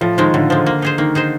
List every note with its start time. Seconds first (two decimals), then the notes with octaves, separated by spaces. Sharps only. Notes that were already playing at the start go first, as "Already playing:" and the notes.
0.01 A2 F3
0.18 D#3 F3 G#3
0.34 A2 D3
0.50 F3 G#3
0.66 A#3
0.82 D#4 G#4 C5
0.98 D#3 A#3
1.15 D#4 G#4 C5